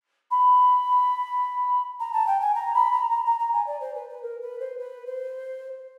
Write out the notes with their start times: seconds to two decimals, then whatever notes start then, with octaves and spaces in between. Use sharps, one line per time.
0.31 B5
2.00 A#5
2.13 A5
2.27 G5
2.41 G#5
2.55 A#5
2.74 B5
2.93 A#5
3.11 A#5
3.26 A#5
3.39 A#5
3.53 G#5
3.67 D5
3.81 C5
3.95 B4
4.09 B4
4.23 A#4
4.41 B4
4.60 C5
4.79 B4
5.06 C5